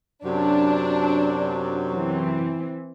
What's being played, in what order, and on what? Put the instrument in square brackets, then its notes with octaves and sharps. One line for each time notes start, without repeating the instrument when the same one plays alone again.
[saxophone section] F#2 C3 F#3 [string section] D4
[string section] E3 C4